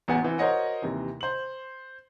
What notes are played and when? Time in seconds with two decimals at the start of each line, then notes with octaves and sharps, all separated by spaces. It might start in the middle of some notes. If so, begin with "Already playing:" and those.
0.08 A1 E2 B3 F#4 F#5 G#5
0.23 E3 C4
0.38 F#4 A#4 C5 C#5 D#5 F#5
0.82 D#2 C3 E3
1.21 C5 F#7